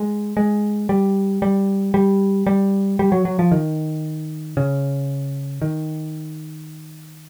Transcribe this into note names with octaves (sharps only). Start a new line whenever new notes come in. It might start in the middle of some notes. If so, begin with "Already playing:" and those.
Already playing: G#3
G#3
G3
G3
G3
G3
G3
F#3
F#3
F3
D#3
C#3
D#3